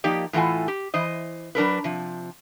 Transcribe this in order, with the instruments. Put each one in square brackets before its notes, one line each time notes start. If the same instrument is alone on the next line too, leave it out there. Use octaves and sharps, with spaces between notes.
[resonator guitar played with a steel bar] F3 A#3 D#4 G4 D5
A2 E3 F4 A4 F#5 G#5
G4
E3 C5 D#5
F#3 D4 A#4 B4
C3 F3